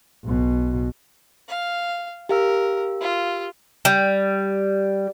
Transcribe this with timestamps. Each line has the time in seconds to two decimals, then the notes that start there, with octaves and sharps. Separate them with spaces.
0.24 B1 B2
1.48 F5
2.29 G4 A#4 F5 E6
3.01 F4
3.85 G3